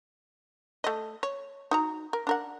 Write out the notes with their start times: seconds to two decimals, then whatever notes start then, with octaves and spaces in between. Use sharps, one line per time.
0.84 A3 D#5
1.23 C#5
1.71 D#4 F#4 A#5
2.13 A#4
2.27 D4 A#4 F#5